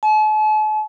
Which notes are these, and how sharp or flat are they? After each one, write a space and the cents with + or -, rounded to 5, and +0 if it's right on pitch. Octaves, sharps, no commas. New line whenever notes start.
A5 -45